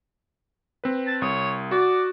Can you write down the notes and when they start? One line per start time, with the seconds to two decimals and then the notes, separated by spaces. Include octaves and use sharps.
0.84 C4 B4
1.07 A5
1.22 C2 C#5 D#6
1.71 F#4 D5